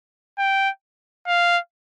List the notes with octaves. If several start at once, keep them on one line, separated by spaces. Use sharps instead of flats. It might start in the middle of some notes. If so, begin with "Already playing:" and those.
G5
F5